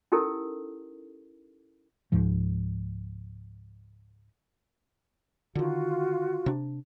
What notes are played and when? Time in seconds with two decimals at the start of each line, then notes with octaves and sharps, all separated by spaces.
0.12 C#4 D#4 E4 G4 A4 A#4
2.12 C#2 G#2 F3
5.55 D3 D#3 F4 F#4
6.46 C3 D4